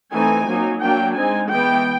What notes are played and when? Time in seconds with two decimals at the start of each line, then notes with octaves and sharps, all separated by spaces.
0.13 E3 A3 C4 D#4 G#5
0.47 F#3 A#3 D#4
0.82 F#3 A#3 D4 G5
1.16 G#3 C4 D#4 G#5
1.50 E3 G#3 B3 G5